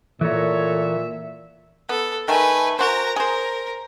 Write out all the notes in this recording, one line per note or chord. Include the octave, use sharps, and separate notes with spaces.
A#2 E3 A3 A4 A#4 C#5 E5
B3 A4
D#3 A3 B4 E5 G#5
F#4 A#4 C5 A#5
G#4 A#4 C5